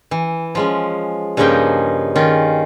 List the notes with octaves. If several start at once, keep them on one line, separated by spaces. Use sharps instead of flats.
E3
F3 G#3 C#4
G2 C#3 F3 A#3 D#4 G5
D#3 C#4 F4